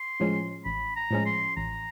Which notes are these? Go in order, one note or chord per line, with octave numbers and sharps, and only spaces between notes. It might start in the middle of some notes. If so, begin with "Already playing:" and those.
Already playing: C6
A2 F3 G#3 C#4
A1 B5
A#5
A2 F3 G#3 C#4
C6
A1 A#5